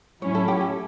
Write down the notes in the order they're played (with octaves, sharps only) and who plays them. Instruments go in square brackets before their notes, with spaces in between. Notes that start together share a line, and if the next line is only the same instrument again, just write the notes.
[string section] A2 F#3 C#4 E4 [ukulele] C#5
[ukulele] A4
G4
A4